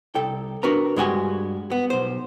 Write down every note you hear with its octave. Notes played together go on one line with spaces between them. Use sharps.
C2 A4 G5
D4 F#4 A#4 B4 A#5
G2 G#3 E4 F#4 G4 G#5
B3
B1 C5